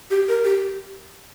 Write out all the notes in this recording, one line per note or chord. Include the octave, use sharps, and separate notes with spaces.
G4
A#4
G4